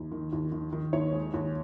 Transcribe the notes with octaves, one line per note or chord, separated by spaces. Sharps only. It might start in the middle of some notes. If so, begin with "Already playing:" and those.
Already playing: D#2
D#3
D#2
D#3
D#3
D#2 C#5
G#3
D#2